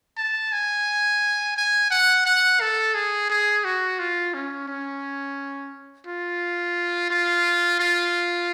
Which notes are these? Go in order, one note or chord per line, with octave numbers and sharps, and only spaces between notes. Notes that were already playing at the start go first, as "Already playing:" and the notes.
A5
G#5
G#5
F#5
F#5
A4
G#4
G#4
F#4
F4
C#4
C#4
F4
F4
F4